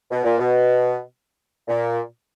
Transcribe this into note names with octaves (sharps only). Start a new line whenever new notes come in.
B2
A#2
B2
A#2